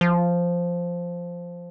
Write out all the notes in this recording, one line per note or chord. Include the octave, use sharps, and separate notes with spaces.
F3